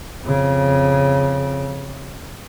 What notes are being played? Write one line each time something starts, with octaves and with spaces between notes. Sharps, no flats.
F2 C#3